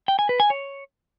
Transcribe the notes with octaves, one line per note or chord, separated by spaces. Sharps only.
G5
G#5
B4
G#5
C#5